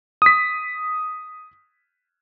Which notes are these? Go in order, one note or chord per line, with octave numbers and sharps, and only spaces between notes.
D#6 B6